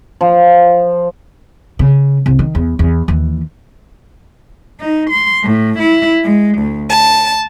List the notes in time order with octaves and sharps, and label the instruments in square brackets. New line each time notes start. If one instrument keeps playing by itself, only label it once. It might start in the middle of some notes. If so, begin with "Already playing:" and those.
[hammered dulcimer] F3
[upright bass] C#3
C2
D#3
E2
E2
D#2 E3
[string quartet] D#4
C6
A2
E4
G#3
D2
A5